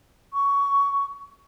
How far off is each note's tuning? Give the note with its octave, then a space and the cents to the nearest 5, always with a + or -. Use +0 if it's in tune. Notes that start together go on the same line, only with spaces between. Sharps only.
C#6 +15